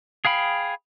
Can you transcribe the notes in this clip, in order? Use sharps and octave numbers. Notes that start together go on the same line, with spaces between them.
G#4 F5 G5 B5